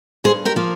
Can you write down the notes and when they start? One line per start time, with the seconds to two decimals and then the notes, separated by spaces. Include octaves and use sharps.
0.24 G2 G#4 C5
0.45 G4 A#4
0.56 F3 A#3